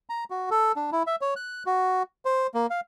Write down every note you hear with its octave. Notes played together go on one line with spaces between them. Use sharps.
A#5
F#4
A4
D4
E4
E5
C#5
F#6
F#4
C5
A#3
F5